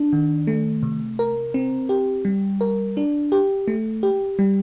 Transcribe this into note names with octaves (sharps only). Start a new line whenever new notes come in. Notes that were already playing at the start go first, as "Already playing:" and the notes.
Already playing: D4
D#3
A3
C3
A#4
C4
G4
G3
A#4
D4
G4
A3
G4
G3